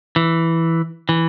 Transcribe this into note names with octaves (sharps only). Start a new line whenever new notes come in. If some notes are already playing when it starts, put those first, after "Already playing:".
E3
E3